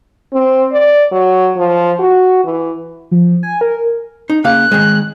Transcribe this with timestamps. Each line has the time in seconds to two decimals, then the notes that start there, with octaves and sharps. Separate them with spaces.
0.33 C4
0.72 D5
1.12 F#3
1.57 F3
1.99 F#4
2.45 E3
3.11 F3
3.43 G#5
3.61 A#4
4.30 D#4
4.44 C#3 A#3 F5 F#6
4.72 D#3 G#3